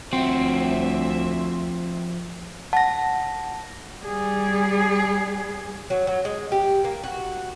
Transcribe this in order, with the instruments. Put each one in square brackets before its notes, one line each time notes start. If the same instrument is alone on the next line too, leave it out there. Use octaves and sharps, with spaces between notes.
[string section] D2 E5 [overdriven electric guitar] F3 F#4 [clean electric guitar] C4
[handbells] F#5 [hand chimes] A5 A#6
[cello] G3 G#4
[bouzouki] F#3
F#3
G#3
G4
A#3
F#4